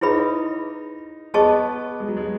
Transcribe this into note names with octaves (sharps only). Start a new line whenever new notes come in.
D#4 E4 G#4 B4 E5 B5
B3 G#4 D#5 A5 C#6
G#3
F#3
G#3